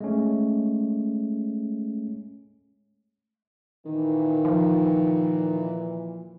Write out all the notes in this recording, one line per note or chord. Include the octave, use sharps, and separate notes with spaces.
G#3 A3 C#4
A#2 D#3 E3
F3